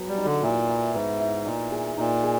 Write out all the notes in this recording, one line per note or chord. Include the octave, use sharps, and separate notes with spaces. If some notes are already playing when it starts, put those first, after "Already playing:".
Already playing: F#3 B3 G#4
G3
D#4
D3
A#2 E4
E4
G#2 B3
E4
A#2 D#4
G#4
A#2 D#4
G#4